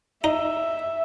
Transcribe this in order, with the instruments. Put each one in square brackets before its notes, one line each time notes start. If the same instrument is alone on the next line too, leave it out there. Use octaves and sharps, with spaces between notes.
[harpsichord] D#4 [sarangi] E5